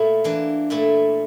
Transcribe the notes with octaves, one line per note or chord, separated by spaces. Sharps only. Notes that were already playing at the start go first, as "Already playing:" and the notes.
Already playing: A#2 A3 E4
E3 A#3 D4
A#2 A3 E4